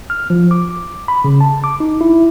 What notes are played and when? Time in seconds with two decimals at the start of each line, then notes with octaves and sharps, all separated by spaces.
0.10 F6
0.30 F3
0.51 D6
1.08 B5
1.24 C#3
1.41 A5
1.64 D6
1.80 D#4
2.01 E4